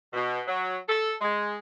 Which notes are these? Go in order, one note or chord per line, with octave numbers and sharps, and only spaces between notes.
B2
F#3
A4
G#3